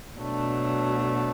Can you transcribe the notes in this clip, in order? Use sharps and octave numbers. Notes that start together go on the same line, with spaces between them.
B2 F#3 A3 D4